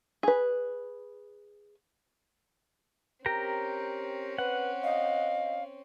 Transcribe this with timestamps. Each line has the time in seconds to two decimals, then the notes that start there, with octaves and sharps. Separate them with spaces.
0.23 G#4 B4
3.26 C4 C#4 G4 A#4 A#5
4.38 B4 F#5
4.83 D#5 F5